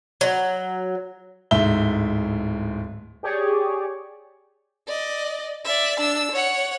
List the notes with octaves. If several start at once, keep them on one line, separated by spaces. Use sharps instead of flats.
F#3
D1 G#2 E5 G7
G4 G#4 C#5 D5
D5 D#5
D5 E5
D4 E6
C#5 F#5